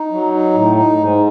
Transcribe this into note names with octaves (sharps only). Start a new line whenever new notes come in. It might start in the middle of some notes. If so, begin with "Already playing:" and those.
Already playing: D#4
F#3
D#4
A2
D#4
G#2